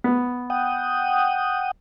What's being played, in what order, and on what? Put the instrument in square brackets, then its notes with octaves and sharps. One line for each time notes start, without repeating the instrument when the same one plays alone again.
[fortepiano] B3
[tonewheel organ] F#5 G5 D#6